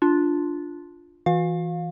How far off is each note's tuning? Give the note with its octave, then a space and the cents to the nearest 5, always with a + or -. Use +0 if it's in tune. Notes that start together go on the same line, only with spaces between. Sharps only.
D4 +0 F4 +0
E3 +0 F#4 -40 F5 +20